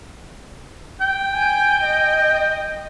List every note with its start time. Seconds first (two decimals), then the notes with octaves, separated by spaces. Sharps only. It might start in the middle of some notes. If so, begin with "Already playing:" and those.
1.01 G5
1.34 G#5
1.84 D#5